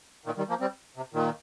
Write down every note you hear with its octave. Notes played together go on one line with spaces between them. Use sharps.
A#2 D#3
D#3 G3
F3 A#3
G3 C4
C3
A#2 D#3